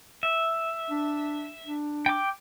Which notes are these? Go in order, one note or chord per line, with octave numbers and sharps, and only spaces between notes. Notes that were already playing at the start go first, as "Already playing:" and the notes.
E5
D4
D4
G5 D6